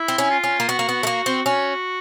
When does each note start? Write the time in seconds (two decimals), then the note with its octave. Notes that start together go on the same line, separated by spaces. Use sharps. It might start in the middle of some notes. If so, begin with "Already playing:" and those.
Already playing: E4
0.08 C4
0.18 C#4
0.31 F4
0.44 C#4
0.60 A#3
0.69 B3 F#4
0.79 A#3
0.89 B3
1.03 A3
1.07 A#3
1.26 C4
1.45 C#4 F#4